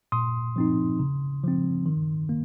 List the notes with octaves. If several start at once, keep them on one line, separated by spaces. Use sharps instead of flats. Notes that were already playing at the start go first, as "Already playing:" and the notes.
A#2 C6 D#6
F3 C4 D#4
C#3
F3 C4
D#3
A#3